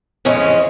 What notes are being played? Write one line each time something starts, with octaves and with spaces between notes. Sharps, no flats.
F2 C#3 E3 G#3 C#4